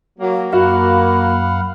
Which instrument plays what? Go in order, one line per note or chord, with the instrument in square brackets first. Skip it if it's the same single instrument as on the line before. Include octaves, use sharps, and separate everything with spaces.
[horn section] F#3 A#3
[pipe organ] F#2 F5 F#5 [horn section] A#3 [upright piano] F#4 [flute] B5